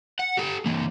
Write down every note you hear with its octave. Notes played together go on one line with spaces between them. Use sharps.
F#5
G4 A4
E3 A#3